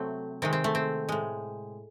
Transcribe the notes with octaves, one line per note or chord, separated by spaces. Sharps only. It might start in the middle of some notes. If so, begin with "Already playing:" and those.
Already playing: C3 F#3 A3 C4
C3 D#3 G#3 C4
C4
A3
C4
A2 G#3